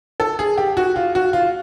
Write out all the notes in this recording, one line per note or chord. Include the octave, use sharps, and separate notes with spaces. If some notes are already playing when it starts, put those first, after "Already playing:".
A4
G#4
G4
F#4
F4
F#4
F4